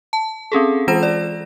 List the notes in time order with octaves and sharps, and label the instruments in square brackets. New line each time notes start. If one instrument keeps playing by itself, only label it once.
[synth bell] A5
C4 C#4 G#4 A4
E3 G#3 F4 C5 A#6 E7
D5